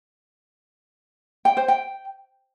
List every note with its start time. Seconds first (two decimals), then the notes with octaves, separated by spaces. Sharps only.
1.45 G5
1.57 C5
1.68 G5